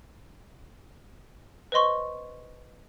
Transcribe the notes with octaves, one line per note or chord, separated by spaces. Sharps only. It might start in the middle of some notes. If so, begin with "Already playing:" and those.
B4 C5 D#5 C6 C#6